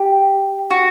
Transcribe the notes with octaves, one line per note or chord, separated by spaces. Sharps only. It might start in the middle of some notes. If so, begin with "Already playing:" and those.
Already playing: G4
F#4